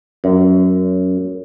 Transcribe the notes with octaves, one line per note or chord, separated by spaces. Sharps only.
F#2